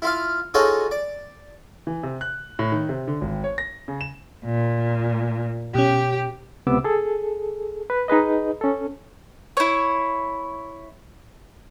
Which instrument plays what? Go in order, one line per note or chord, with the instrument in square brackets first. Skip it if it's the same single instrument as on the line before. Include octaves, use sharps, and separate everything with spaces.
[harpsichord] E4 F4 F5
D#4 F4 F#4 G#4 A4 C#5
D5
[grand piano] E3
C3
F#6
A2
D#3
C3
D3
G#1
C#5
A#6
C#3
E7
[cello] A#2
[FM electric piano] B2 C#4 [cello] G4
[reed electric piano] C#2 C3 B3 D6 E6
G#4 A4
B4
D#4 G#4 B4 D#5
C#4 A4
[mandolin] E4 C#5